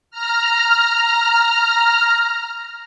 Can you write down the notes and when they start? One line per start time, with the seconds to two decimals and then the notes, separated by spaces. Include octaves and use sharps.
0.11 A#5 F6